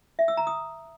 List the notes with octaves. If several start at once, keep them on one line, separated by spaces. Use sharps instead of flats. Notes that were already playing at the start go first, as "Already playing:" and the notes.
E5
E6
A#5
D#6